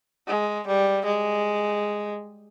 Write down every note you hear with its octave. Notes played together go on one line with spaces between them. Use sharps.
G#3
G3
G#3